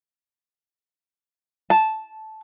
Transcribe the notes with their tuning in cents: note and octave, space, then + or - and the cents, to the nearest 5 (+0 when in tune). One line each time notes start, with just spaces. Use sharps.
A5 -10